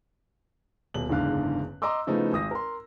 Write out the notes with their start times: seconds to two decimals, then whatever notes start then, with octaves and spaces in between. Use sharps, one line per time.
0.94 D#1 B2 F#7
1.09 F#1 E2 G#2 D3 F5 F#6
1.82 D#5 A#5 C6 D6 E6
2.07 C#3 F3 A3 B3 D#4 E4
2.33 G#1 D#6 A#6
2.51 A#4 C6